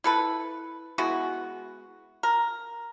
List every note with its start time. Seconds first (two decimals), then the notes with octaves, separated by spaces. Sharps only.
0.04 E4 A4 B4
0.98 G#3 B3 E4 F#4
2.23 A#4